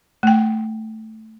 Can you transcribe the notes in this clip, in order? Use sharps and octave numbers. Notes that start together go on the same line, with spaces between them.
A3 G5